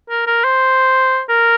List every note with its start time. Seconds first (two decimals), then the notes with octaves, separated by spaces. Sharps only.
0.09 A#4
0.27 A#4
0.44 C5
1.29 A#4